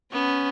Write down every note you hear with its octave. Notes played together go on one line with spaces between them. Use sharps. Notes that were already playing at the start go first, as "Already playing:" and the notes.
B3 C#4